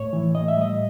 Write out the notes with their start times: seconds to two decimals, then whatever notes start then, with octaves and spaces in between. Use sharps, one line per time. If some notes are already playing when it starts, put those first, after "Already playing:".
Already playing: A2 C#5
0.13 E3
0.35 A2 D#5
0.48 E5
0.57 G3 D#5